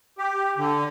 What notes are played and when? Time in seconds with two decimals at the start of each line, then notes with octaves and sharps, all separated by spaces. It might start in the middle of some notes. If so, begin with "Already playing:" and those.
0.18 G4
0.57 D3